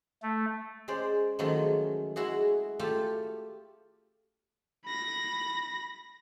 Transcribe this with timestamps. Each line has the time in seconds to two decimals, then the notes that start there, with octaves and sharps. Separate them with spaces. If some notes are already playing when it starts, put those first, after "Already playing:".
0.23 A3
0.88 G#3 C#4 C5 D5
1.39 D#3 F3 F#3 G#3 A3 C#4
2.16 G#3 E4 F#4 G#4
2.79 A3 F4 G4
4.85 B5 A#6